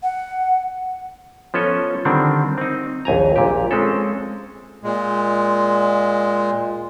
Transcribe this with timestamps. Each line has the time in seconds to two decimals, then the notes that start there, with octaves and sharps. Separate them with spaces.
0.03 F#5
1.54 F3 B3 C#4 A4 C#5 D#5
2.05 D3 D#3 G3 C4 D4
2.58 C4 D#4
3.05 A#1 D#2 G#5 A#5
3.36 A#1 A#2 G4
3.71 G#3 C4 C#4 A4
4.83 A#2 G#3